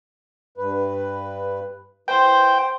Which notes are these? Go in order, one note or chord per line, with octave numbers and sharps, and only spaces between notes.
G2 B4
E3 C5 G5